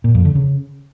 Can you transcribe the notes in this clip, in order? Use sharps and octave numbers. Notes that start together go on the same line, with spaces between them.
A#2
F2
D3
C#3